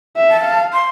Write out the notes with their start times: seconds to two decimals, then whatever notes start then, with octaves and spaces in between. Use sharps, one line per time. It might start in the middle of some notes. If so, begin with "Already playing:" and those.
0.17 E5
0.30 A5
0.44 F5
0.73 C6